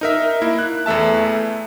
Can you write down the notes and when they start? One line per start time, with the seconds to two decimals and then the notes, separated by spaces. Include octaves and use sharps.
0.01 D#4 A#4 E5
0.42 A#3 E4
0.59 F#6
0.86 E2 E3 A3 E5 A5